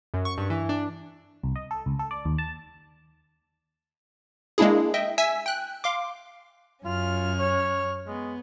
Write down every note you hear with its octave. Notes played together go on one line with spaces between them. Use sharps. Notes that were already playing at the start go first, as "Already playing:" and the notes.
F#2
C#6
G2
E3
D4
C2
D#5
A4
C#2
A4
D5
D#2
A5
G#3 A#3 D4 E4 G#4
D#5 E5 G5
E5 G#5 E6 B6
G5 F#6
F5 C6 D6
F#2 C#4 F4 F6
C#5
G#3 B3